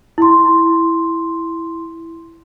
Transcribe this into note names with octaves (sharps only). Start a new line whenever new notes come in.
E4 C6